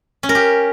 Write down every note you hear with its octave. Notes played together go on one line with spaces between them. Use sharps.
C#4
A#4
G4